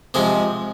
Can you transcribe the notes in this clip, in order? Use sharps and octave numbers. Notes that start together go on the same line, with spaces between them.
C3 F3 G#3 G#4